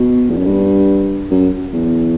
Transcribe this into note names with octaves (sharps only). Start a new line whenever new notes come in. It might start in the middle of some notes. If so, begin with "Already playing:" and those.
Already playing: B2
E2
F#2
G2
F#2
E2